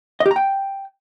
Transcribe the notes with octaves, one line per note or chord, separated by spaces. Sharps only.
D#5
G4
A#5
G5